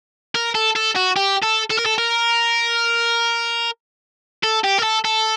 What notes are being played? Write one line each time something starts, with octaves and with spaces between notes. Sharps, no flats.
A#4
A4
A4
F#4
G4
A4
A4
A#4
A4
A#4
A4
G4
A#4
A4
A4